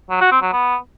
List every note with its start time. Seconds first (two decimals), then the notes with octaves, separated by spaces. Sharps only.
0.10 F#3
0.21 F#4
0.31 C4
0.42 F#3
0.53 B3